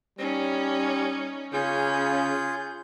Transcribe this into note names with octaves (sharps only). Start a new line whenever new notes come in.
G3 C#4 D#4
C#3 C#4 F4 G#4 G6